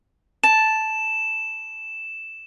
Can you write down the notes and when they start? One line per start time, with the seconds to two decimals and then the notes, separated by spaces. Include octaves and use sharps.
0.44 A5 E7